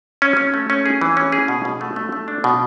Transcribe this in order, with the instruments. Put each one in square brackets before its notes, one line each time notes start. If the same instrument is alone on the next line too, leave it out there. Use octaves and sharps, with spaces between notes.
[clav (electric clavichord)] C#4
C#4
A3
C#4
G#4
E3
C#4
G#4
B2
B2
A3
A3
A3
D4
B2